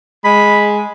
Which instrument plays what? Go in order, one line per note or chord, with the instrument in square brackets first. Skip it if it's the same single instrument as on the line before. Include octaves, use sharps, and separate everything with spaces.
[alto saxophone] G#3 [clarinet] B5